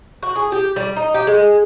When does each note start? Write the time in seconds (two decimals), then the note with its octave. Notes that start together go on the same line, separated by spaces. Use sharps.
0.23 F#4
0.35 G#4
0.52 G4
0.76 G3
0.96 D#4
1.14 G4
1.27 G#3